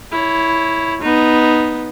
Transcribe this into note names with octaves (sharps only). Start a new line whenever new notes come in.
E4 C#5
B3 D#4